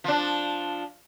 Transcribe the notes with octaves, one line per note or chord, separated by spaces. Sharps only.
F3 D4